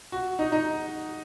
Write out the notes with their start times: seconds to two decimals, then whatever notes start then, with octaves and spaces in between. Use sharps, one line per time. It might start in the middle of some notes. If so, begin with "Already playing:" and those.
0.12 F#4
0.39 D#4
0.52 D#4